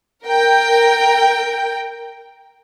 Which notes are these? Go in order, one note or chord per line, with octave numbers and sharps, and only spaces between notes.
A#4 G5